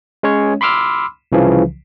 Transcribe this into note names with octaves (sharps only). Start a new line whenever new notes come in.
G#3 C#4 C#5
B5 C6 D6 E6 F6
C2 C#3 E3 F3